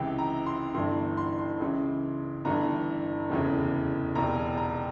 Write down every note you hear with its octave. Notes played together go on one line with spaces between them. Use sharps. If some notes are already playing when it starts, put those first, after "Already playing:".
Already playing: C#2 C3 E3 G5
A#5
C6
G1 G2 E3 C6
C6
C6
C#2 C#3 E3
G1 G2 E3 A#5
F1 E2 C#3 E3
E1 E2 C3 A#5
G#5
A#5